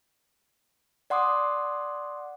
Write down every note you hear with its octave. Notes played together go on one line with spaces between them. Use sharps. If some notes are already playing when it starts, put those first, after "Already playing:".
D5 F#5 C6 D6 D#6